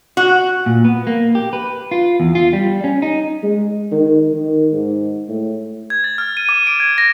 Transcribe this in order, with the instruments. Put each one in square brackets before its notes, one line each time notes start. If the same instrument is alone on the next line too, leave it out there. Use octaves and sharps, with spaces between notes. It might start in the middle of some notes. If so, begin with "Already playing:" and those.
[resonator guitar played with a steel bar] F#4
[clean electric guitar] A#2
B3
A#3
G4
B4
F4
E2
F4
G3
C#4
D#4
[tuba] G#3
D#3
D#3
G#2
A2
[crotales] G#6
A6
F6
D#7
D6
D7
G#6
A#6